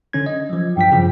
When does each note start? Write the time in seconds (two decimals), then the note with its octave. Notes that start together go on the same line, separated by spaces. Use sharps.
0.13 D3 C#4 G#6
0.26 D#5
0.50 F3 F#3
0.77 G2 F3 G5 B6
0.91 F#2 C#3 F3